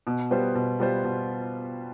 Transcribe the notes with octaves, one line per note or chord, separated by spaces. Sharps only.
B2
G3 B3 F4 C5
B2
G3 B3 F4 C5
B2